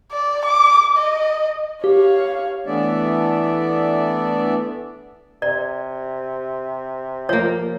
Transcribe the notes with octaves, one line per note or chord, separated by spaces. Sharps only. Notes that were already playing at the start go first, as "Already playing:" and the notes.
D5
D6
D#5
G4 C#5 F5
E3 A3 B3 D4 D5 E5
C3 D5
F3 A#3 C#5